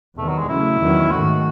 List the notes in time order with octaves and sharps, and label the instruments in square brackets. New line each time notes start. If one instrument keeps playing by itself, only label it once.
[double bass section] E2 C3 D#3 [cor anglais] A3
[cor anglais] F#3
G#3
[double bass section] C#3 F#3 A3 C#4 [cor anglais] E4
[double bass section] E2 D#3 F#3 C#4
[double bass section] G#2 D#3 A3 [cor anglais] F#4